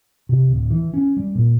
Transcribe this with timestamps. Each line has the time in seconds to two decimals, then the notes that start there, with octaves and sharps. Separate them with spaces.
0.29 C3
0.49 D1
0.71 E3
0.94 C#4
1.17 G3
1.35 A#2